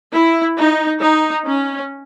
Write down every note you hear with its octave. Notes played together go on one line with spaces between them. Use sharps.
E4
D#4
D#4
C#4